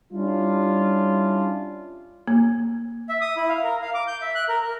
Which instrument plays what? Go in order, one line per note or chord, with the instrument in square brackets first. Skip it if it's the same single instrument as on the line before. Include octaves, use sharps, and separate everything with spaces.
[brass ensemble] G3 C#4 D4 E4 F4
[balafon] A#3
[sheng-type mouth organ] E5
D#6
E4
F5
A#4
F5
D6
G6
E5
F#6
A#4
A#4